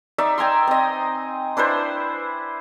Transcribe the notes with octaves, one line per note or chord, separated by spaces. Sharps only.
D#4 D5 E5
G5 G#5 A#5 C6
C4 D#5
D4 E4 B4 C5